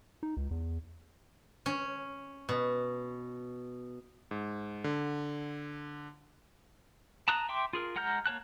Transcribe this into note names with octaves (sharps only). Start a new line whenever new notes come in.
D#4
C#2
E2
C#4
B2
G#2
D3
A5 A#5 D#6 F#6
E5 G5 C6 D6
F4 G#4 A#4
G#3 F#5 A#5 F6 G6
A#3 C#5 A5 F#6